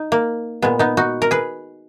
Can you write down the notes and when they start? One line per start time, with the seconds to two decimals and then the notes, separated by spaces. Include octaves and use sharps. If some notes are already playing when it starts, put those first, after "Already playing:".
Already playing: D#4
0.12 A#3
0.62 A#2 G#3 B3
0.79 B3 D#4
0.97 D#4 F#4
1.22 A#4
1.31 G#4 B4